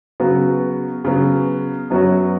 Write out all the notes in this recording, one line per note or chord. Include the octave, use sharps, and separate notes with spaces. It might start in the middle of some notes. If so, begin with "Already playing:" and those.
C#3 F#3 B3 F#4
C#3 F#3 B3 F#4
F#2 F#3 B3 F#4 C#5